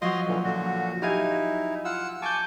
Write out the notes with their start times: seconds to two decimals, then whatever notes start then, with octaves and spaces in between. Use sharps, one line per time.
0.02 F3 F#3 D#5 F5 C6
0.27 A#2 D3 E3
0.44 A#2 D3 F#4
1.02 D#4 E4 G4 F5 G#5
1.85 F4 F#5 E6
2.22 G#5 A5 C#6 D6 G6